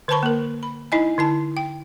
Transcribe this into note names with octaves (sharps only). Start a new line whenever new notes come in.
D3 B4 C5 A5 B5 C#6
A#3 A#4
B5
D#4 E4 D#5 G#5
D3 E4 A5
G5